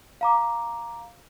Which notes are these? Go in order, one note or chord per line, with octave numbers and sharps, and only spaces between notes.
F5 A#5 D6